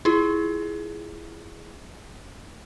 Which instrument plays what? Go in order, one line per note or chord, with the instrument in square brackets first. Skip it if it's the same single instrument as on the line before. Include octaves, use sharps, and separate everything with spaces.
[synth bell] E4 F4 G#4